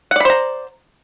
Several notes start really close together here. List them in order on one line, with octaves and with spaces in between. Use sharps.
F#5 D5 B5 C5 A#5